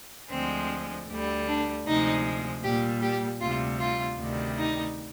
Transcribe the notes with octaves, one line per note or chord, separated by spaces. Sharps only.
D2 D3 F3 G#3 C4
D2 D3 G3
D4
D2 C3 F3 G#3 D#4
A#2 G3 G4
G4
D2 C3 G3 F4
F4
D2 C3 D#3 G3
D#4